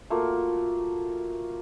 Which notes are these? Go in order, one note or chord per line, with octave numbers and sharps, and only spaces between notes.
A3 A#3 F4 F#4